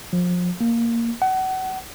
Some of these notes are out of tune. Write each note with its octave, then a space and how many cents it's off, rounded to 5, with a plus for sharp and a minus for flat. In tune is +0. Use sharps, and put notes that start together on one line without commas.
F3 +30
A#3 -5
F#5 +30